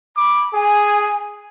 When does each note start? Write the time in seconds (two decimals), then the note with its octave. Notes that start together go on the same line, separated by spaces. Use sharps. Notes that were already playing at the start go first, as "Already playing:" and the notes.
0.17 B5 D6
0.54 G#4 G#5